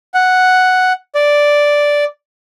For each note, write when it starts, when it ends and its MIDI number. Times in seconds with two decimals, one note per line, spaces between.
0.14 0.93 78
1.15 2.04 74